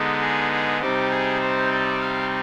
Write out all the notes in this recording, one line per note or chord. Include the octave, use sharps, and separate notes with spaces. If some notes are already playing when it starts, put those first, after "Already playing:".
Already playing: D3 G#3 B3 D#4
G#4
G#4
C3 G3 C4 D#4 G4
G#4
C5
D5
F5